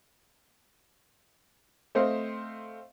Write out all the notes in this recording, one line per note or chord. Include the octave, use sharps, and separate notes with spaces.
A3 C4 C5 D#5 F5